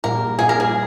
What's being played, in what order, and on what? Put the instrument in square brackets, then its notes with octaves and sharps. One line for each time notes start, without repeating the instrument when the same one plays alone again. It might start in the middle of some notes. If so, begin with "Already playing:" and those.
[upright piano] A#1 A#2 G3 [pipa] A#4
[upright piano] A#1 A#2 G3 [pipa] G#4
[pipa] A#4
G#4